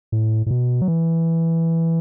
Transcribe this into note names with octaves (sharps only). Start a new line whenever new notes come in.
A2
A2
B2
F#3
E3